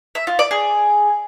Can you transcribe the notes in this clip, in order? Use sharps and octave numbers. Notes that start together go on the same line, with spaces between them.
E5
F4
D5
G#4